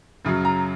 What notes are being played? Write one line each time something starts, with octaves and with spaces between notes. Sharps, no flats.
F#2 C#3 F#3
A#5